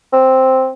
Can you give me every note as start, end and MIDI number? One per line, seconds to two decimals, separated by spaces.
0.13 0.70 60